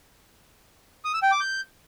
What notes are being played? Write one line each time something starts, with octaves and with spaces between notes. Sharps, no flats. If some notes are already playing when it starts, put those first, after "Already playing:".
D#6
E6
G5
D6
G6